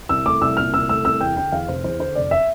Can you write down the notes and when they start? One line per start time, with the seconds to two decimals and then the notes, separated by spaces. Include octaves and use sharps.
0.09 C2 E6
0.25 A3 D6
0.41 C2 E6
0.57 A#2 F6
0.74 C2 E6
0.89 A3 E6
1.05 C2 E6
1.21 E2 G5
1.37 D3 G5
1.52 E2 F5
1.68 F1 C5
1.84 E2 C5
2.00 D3 C5
2.15 F1 D5
2.31 E5